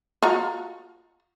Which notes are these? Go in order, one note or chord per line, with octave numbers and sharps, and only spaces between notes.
F4 F#4 A#5